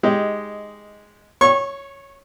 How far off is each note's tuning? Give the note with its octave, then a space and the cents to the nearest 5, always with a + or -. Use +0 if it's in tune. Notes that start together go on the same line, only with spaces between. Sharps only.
G#3 +0 D#4 +10 G4 +0
C#5 +0 C#6 -25